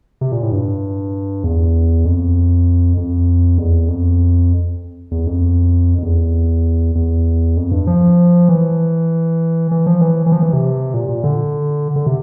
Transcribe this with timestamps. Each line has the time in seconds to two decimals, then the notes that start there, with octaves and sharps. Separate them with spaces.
0.21 C3
0.32 A#2
0.42 A2
0.52 G2
1.44 E2
2.05 F2
2.97 F2
3.58 E2
3.88 F2
5.11 E2
5.27 F2
5.98 F2
6.03 E2
6.95 E2
7.57 F2
7.72 G2
7.87 F3
8.49 E3
9.71 E3
9.86 F3
10.01 E3
10.26 E3
10.32 F3
10.43 E3
10.53 C3
10.94 A#2
11.09 A#2
11.24 D3
11.96 D3
12.06 C3